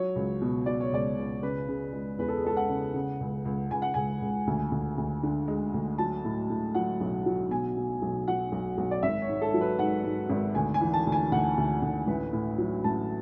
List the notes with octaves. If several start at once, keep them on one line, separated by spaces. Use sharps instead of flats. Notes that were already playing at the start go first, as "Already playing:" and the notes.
Already playing: F#3 C#5
C#2
B2
B2 D5
C#5
C#2 D5
C#2
C#3 B4
C#3
G#3
E2 B4
A4
G#4
G#3 A4
F#5
C#3
C#3
C#2
C#2
C#2 G#5
F#5
C#2 G#5
C#2
D2
D2
D2
D3
G#3
D2
F#3 A5
A2
A2
F#3 F#5
B1
F#3
B2 G#5
B2
B1
F#3 F#5
B1
B1
D5
G#1 E5
C#5
G#2
A4
F#3
B4
G#2 F#5
G#2
G#1
D2 G#5
G#5
E3
A5
D2
G#5
D2 F#5
D2
D2
A1 B4
A2
F#3
A1 A5